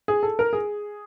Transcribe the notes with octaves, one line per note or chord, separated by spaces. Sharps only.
G#4
A4
A#4
G#4